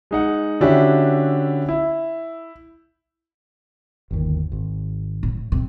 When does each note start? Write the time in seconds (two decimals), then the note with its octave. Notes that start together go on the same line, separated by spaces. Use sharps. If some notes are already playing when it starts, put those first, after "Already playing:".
0.11 G#3 D#4 F#5
0.61 D3 C#4 D4 E4 F#4 G4
1.69 E4
4.11 G1 D#2
4.52 G#1
5.23 A2
5.52 C3